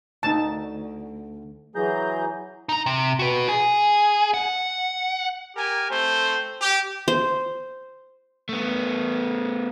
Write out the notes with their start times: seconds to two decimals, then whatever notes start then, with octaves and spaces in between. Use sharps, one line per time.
0.23 D2 D#4 A5
1.75 E3 F#3 G#4 A#5 G6
2.69 D#4 A#5
2.86 C3
3.19 F#4 B4
3.49 G#4
4.34 F#5
5.56 G4 A#4 G#5
5.90 A3 C4 C5
6.60 G4
7.08 C5
8.49 A3 B3